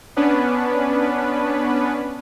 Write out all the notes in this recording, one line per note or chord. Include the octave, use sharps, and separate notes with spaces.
B3 C#4 D4 B4